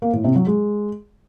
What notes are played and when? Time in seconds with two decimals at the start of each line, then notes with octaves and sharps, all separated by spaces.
0.02 A#3
0.13 A2
0.24 C3
0.36 F#3
0.47 G#3